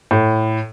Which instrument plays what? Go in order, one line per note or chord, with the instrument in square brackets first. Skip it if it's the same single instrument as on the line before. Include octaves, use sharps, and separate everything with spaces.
[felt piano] A2